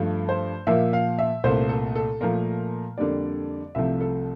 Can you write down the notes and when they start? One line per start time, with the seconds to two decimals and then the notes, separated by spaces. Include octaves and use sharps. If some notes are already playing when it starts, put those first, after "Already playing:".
Already playing: G2 F3 A3
0.29 C5
0.67 A#2 F3 A#3 E5
0.93 F5
1.19 E5
1.44 C2 A#2 A3 C5
1.69 A4
1.95 A4
2.21 A#2 F3 A3 A#4
2.98 F2 D3 G3 A#3 D5
3.75 C2 C3 F3 A3 E5
4.01 A4